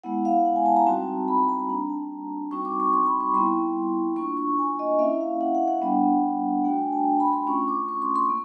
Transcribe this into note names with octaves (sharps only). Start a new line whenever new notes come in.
G#3 B3 E4 F#5
F5
F#5
G#5
A5
A#5
G3 C4 D#4 F#4 A5
B5
A#5
G3 A#3 D4 A#5
A5
G3 C4 D#4 F#4 C#6
D6
C#6
C6
B5
C#6
G3 B3 E4 C6
A#3 D4 F4 C#6
C#6
C#6
G#5
D#5
A#3 C#4 E4 E5
F5
F#5
F#5
F#5
G3 B3 D4
A3 D4 F#4 G5
G#5
A5
A5
B5
C6
A3 C#4 F4 C#6
D6
C#6
C6
C6
A#3